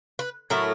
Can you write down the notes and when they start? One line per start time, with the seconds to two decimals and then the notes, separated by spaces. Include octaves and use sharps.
0.19 B4
0.50 A2 F#3 A3 A#4